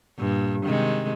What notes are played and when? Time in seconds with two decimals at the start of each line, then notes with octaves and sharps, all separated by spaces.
0.19 G2 A#2
0.64 C3 D#3 G#3